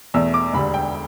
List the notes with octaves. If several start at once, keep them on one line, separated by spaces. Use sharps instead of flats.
E2 B2 A3 E6
D6
E1 D2 D3 G3 B5
G5